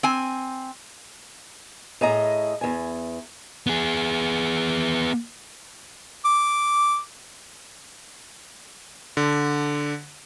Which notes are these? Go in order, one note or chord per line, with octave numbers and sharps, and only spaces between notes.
C4 G#5
A2 G#4 D#5 A#5
E2 G#5
B3 G#4
D6
D3